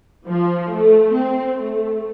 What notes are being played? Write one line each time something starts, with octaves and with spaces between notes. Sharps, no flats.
F3
A3
C4
A3